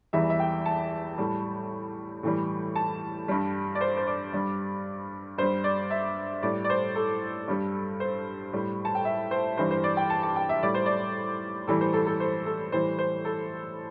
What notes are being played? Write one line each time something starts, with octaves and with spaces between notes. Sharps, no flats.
E2 E3 G3 E5
E5
G5
A5
A2 G3
A2 E3 G3
A5
G2 G3
D5
C5
C5
D5
G2 G3
G2 G3 C5
D5
E5
A2 G3 D5
D5
C5
A4
G2 G3
C5
A2 G3
A5
G5
E5
C5
G2 E3 G3 C5
C5
D5
G5
A5
A5
G5
E5
A2 G3 D5
C5
D5
A2 E3 G3 A4
C5
A4
A4
C5
A4
A2 E3 G3 C5
C5
A4